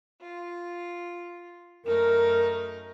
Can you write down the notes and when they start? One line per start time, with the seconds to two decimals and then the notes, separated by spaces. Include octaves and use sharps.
0.21 F4
1.85 F#2 A3 D#4 A#4